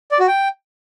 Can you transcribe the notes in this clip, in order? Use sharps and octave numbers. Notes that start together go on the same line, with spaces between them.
D5
F#4
G5